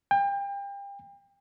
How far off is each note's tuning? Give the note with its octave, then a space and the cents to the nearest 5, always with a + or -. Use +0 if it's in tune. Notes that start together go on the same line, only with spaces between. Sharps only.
G5 +30